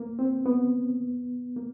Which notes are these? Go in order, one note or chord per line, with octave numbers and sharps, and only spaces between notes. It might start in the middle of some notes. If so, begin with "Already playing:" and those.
Already playing: A#3
C4
B3
A#3